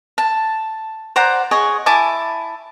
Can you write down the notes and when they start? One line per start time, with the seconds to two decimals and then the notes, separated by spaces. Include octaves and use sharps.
0.18 A5
1.16 C5 D5 F#5 A#5
1.51 G#4 C#5 D#5
1.86 E4 G#5 A5 D6